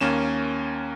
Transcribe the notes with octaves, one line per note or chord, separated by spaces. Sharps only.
D#2 A#3 C#4 E7